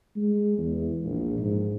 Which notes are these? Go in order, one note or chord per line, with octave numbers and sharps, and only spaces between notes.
G#3
E2
A#1
G#2